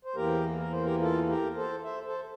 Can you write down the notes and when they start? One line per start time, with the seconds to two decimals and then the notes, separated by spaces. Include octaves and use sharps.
0.05 C5
0.15 E2 E3 A#3 G4 A#4
0.58 A#4
0.71 C5
0.84 G4 A#4
1.00 F4 A4
1.28 G4 A#4
1.56 A4 C5
1.84 C5 E5
2.06 A4 C5